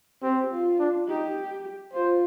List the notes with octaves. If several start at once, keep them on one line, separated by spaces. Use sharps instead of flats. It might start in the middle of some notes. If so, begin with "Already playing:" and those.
C4 G4
F4
D4
D#4 G4
F4 C5